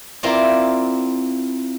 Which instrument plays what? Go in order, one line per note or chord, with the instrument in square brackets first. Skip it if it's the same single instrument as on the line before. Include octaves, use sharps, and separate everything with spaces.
[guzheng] C4 E4 F4 A#4 D5